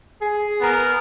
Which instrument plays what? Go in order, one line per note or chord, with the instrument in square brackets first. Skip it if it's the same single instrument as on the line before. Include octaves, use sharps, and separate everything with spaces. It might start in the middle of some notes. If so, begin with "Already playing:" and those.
[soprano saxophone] G#4
[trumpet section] B3 A#4